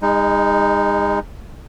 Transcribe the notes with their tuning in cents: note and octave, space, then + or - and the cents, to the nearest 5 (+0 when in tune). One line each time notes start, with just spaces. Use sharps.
G#3 -35 D#4 +0